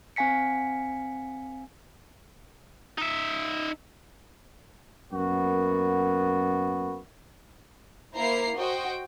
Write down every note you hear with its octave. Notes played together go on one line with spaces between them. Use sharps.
C4 F5 G#5 B6 C#7
D#4 E5
F#2 A#3 B3 F#4
A#3 E4 C5 A#5 C7
F#4 C5 D#5 G5